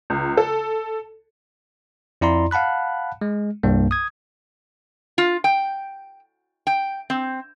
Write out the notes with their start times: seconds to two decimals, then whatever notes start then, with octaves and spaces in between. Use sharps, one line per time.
0.10 C#2
0.37 A4
2.21 F2 E4 D5 A#5 C6
2.51 F5 F#5 A5 B5 F#6
3.21 G#3
3.63 C2 G2 A#3
3.91 D#6 G#6
5.18 F4
5.44 G5
6.67 G5
7.10 C4